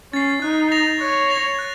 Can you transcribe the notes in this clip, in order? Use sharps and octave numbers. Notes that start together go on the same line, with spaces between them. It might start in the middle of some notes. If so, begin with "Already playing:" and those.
C#4 A6 C7
D#4 F#6
A#6 F7
C#5 F#6
A#6 F7
F#6